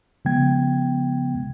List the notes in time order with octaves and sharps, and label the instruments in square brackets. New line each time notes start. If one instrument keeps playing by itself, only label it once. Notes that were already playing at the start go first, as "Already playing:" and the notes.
[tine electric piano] C#3 F3 G#3 B3 G5 G#6